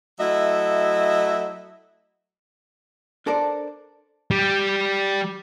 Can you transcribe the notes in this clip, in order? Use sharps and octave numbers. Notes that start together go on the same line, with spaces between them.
F#3 A3 E4 D#5 E5
D4 A4 A#4 C5 D5
G3